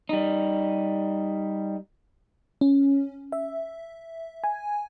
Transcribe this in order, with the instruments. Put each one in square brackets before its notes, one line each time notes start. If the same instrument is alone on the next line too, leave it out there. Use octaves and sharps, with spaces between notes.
[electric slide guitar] G3 D#4
[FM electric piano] C#4
E5
G#5